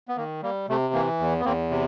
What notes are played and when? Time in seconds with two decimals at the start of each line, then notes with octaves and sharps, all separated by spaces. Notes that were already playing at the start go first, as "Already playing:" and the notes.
0.08 B3
0.17 D#3 A#3
0.42 G3 A#3
0.69 C3 A3
0.93 E3 A#3
1.19 E2
1.40 B3
1.45 E2 A#3 C4
1.70 C3